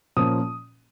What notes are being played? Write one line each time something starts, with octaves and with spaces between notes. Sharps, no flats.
A#2 F3 A#3 C#4 D#6